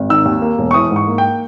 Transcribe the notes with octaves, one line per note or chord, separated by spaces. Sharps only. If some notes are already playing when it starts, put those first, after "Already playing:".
Already playing: G#1
D#3 E6
D#2
A#3
E1
C#6
E3 D#6
G#2
C#6
A#3
G5